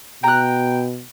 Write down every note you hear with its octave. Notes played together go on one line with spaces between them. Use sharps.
B2 G5 A#5 F#6